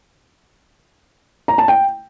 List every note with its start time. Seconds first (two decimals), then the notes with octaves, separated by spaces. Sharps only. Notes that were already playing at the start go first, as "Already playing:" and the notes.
1.48 A#5
1.58 A5
1.68 G5